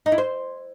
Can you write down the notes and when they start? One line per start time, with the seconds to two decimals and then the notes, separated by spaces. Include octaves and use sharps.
0.06 D#4
0.12 E4
0.18 C5